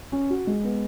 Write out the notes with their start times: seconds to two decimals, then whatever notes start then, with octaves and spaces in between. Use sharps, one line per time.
0.12 C#4
0.30 F#4
0.47 G#3
0.64 B3